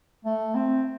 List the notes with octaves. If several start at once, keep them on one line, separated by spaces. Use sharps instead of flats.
A3
C4